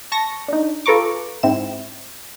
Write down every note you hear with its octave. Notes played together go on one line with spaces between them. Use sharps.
A5 C#6 A#6
D4 D#4
F4 A4 B4 A#5 C#6 D6
G#2 C4 E4 E7